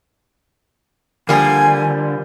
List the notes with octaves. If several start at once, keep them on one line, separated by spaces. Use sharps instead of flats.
D3 F3 G3 A#3 G#5